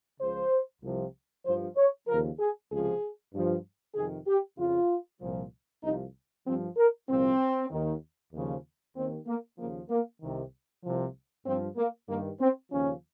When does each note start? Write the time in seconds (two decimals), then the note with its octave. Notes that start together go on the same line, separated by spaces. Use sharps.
0.20 C#2 C#3 F3 C5
0.82 C2 C3 F3
1.45 G2 F3 C5
1.77 C#5
2.07 D#2 C#3 F3 A#4
2.39 G#4
2.70 C#2 C3 F3 G#4
3.33 G2 F3
3.95 F2 C3 D#3 G#4
4.27 G4
4.57 F2 C#3 F3 F4
5.20 C2 A#2 F3
5.82 C2 C3 F3 D#4
6.45 G2 F3 C4
6.76 A#4
7.08 C2 A#2 F3 C4
7.70 D#2 D#3
8.32 D#2 C#3 F3
8.96 D#2 D#3 C4
9.26 A#3
9.57 D#2 C#3 F3 A#3
9.90 A#3
10.20 C2 C3 D#3
10.83 C2 C3 F3
11.45 G2 F3 C4
11.76 A#3
12.08 G2 D#3 A#3
12.40 C4
12.70 D#2 C#3 F3 C#4